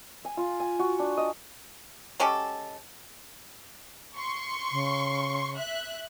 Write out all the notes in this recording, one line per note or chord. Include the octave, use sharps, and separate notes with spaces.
G#5
F4
G#5
F#4
D4
D#5
G#3 C#4 G4 A4
C6 C#6
C#3
E5 F#6